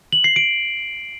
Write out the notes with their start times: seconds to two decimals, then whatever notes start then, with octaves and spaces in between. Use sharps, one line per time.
0.13 F#7
0.24 C7
0.36 D7